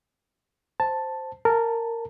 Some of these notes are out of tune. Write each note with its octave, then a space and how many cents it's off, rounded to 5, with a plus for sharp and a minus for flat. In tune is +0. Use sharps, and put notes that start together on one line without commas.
C5 +0 A5 +0
A#4 -15 A5 +0